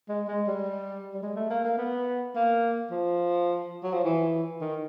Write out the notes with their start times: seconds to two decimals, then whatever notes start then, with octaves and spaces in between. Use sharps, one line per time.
0.09 G#3
0.28 G#3
0.47 G3
1.14 G3
1.22 G#3
1.36 A3
1.50 A#3
1.64 A#3
1.78 B3
2.35 A#3
2.91 F3
3.83 F#3
3.93 F3
4.04 E3
4.61 D#3